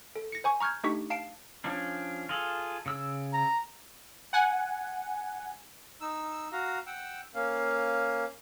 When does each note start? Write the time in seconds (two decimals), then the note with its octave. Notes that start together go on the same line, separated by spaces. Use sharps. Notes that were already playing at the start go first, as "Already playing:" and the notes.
0.16 A4
0.32 A#6 C#7
0.44 C5 G#5 C#6
0.60 A#5 C#6 F6 G6 G#6
0.84 A3 D4 D#4 G4 C#6 B6
1.10 F5 A5 C7 D7
1.64 F3 C#4 D4
2.29 F4 G#4 A4
2.86 C#3 E6
3.33 A#5
4.33 F#5 G#5
6.01 D#4 E6
6.52 F#4 F5 A#5
6.86 F#5 G5 E6
7.34 A#3 C#4 F5